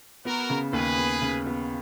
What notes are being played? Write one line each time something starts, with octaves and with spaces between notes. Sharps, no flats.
B3 F#4 A#4
C#3
D#2 G#4 B4
B3
C#3
B3